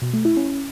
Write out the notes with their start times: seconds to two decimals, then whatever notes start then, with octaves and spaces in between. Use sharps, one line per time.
0.02 B2
0.13 A3
0.25 E4
0.36 C#4